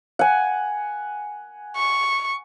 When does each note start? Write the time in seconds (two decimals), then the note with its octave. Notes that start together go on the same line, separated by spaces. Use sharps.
0.19 F#5 G#5
1.77 C#6